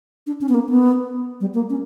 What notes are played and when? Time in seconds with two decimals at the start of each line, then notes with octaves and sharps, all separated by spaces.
0.27 D4
0.41 C#4
0.49 B3
0.54 A#3
0.69 B3
1.41 G3
1.54 A#3
1.70 C#4